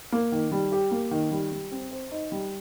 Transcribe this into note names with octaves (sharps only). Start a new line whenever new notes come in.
A#3
D#3
G3
G4
A#3
D#3
G3
G3
C4
C5
D#4
G3